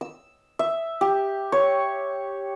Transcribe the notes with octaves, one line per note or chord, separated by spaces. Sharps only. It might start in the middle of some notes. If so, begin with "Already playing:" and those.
E6
E5
G4
C#5